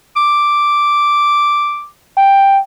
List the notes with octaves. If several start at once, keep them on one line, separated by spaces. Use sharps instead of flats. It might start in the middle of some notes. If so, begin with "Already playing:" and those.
D6
G5